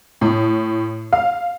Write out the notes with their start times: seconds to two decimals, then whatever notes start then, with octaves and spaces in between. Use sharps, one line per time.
0.21 A2
1.13 F5